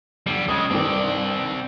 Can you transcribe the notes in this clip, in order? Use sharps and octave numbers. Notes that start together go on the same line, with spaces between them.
D3 G3 C7
C#3 G#3 D#6
G2 D#3 C4 D5